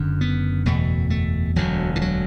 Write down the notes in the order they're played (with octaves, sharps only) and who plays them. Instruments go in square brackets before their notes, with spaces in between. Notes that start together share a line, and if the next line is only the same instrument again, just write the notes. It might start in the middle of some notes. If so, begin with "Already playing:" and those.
Already playing: [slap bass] F#1 F#2 D3
B3
F#1 E2 B2 A3
A3
E1 D2 D3 F#3
E3
F#3